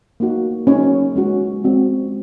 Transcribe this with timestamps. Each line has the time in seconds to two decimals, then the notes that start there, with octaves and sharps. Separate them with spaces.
0.20 A#3 D#4 F#4
0.67 A#3 C#4 D#4 F#4 C#5
1.16 G#3 C#4 F#4
1.64 G#3 C4 F#4